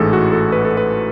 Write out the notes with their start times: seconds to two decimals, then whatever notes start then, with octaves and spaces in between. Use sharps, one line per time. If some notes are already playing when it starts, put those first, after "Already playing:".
Already playing: A1 G#2 E3 A3 G#4 A4
0.13 F#4
0.32 A4
0.52 B4
0.65 A4
0.77 B4